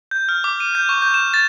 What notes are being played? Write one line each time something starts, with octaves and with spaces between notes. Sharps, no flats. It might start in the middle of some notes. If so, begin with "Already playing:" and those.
G6
F6
D6
D#7
G6
C#6
G6
E7
A6